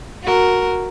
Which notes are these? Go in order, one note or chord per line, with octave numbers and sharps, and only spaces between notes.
F#4 A#4